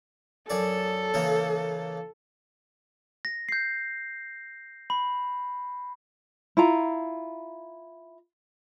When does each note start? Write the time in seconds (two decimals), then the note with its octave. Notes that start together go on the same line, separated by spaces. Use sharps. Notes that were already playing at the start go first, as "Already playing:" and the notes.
0.50 F#2 G#4 A4 D5
1.14 C#3 E3 A#3
3.25 A#6
3.49 G6 C7
4.90 B5
6.57 E4 F4 A#5